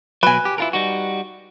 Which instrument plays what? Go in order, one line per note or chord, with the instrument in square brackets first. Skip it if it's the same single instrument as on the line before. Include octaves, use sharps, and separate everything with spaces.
[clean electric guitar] B2 F#3 [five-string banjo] B4 G#5
[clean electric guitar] G4
E4 F4 A#4
G3 D#4 F#4